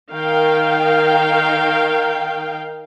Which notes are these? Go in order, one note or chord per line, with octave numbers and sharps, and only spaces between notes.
D#3 A#4 F5 G5